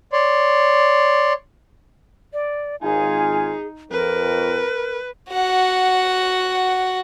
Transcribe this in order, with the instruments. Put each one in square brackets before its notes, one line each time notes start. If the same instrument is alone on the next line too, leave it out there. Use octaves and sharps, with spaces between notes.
[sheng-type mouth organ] C#5 D5 C6
[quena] D5
[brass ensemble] G#1 F4 G#5 [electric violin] D#4 [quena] G#4
[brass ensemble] F2 [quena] A#4 [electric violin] B4
[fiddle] F#4 F#5